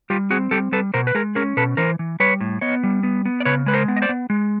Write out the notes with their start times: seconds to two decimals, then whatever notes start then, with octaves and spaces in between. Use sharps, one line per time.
0.10 G3 F4 G4
0.30 C4 F#4 G#4
0.51 G3 G4 A4
0.72 G3 A4 B4
0.94 B2 A#4 C5
1.07 B4
1.15 G#3 G#4 A#4
1.35 C#4 G#4 A#4
1.57 B2 A4 B4
1.77 E3 A#4 C5
1.99 E3
2.20 G3 B4 C#5
2.41 A2
2.61 B3 C#5 D#5
2.83 G3
3.03 B3
3.25 B3
3.40 D5
3.45 C#3 B4 C#5
3.66 G#3 B4
3.74 A#4 C5
3.88 B3
3.97 D#5
4.02 C5 D5
4.09 B3
4.30 G#3